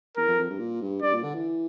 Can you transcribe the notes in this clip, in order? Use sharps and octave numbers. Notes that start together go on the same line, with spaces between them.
E2 A#4
F2
F2
G2
A#2
G2
G2 D5
A#2
D3
E3